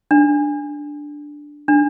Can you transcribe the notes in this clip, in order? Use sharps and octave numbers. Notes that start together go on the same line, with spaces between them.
D4
D4